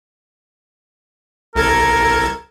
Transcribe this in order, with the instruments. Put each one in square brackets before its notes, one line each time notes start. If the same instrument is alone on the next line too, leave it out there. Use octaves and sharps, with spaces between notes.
[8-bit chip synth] C2 A4 G#6 [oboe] A#4